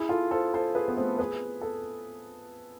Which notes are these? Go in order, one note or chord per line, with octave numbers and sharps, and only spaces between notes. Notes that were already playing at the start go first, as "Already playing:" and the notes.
Already playing: E4 G#4
F4 A4
A4 C5
A4 C5
G#4 B4
B3
A3 C4
G#4 B4
A4